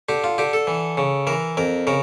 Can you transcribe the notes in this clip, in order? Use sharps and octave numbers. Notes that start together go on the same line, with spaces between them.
D3 G4
F4
D3 G4
A4
E3
C#3
E3 A#4
F2 A#4
C#3 A#4